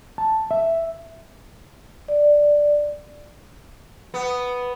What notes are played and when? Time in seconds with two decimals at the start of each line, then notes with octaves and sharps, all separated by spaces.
0.18 A5
0.51 E5
2.08 D5
4.14 B3